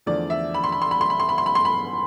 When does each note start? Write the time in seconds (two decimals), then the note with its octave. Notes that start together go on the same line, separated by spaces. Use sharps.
0.06 E2 D3 F3 A3 D5
0.30 E5
0.54 B5
0.64 C6
0.72 B5
0.82 C6
0.91 B5
1.01 C6
1.10 B5
1.20 C6
1.29 B5
1.38 C6
1.46 B5
1.55 C6
1.65 B5